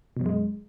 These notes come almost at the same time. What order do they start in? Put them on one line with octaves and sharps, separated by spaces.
B2 F#2 G#3